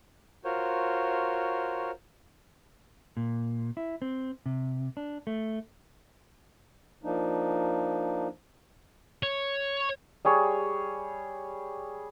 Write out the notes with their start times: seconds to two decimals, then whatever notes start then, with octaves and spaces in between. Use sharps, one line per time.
0.45 F4 F#4 A#4 C5 C#5
3.17 A#2
3.77 E4
4.02 C4
4.46 C3
4.97 D4
5.27 A3
7.04 F3 A#3 D4 D#4
9.23 C#5
10.25 G3 G#4 C#5